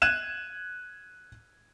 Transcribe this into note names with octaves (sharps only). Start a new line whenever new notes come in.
F#6 G#6 D#7 E7